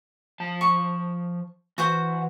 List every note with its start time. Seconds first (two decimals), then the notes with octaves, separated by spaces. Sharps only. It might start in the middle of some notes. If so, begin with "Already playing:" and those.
0.40 F3 A5
0.61 C#6
1.78 E3 F#4 C5 F#5